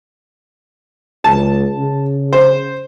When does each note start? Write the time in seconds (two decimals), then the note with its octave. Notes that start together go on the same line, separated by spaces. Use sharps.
1.24 C#2 A5
1.79 C#3
2.33 C5